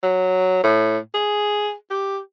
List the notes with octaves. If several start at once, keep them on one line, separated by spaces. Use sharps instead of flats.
F#3
A2
G#4
G4